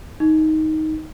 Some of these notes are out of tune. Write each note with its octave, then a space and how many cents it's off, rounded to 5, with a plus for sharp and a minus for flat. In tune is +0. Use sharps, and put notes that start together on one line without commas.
D#4 +10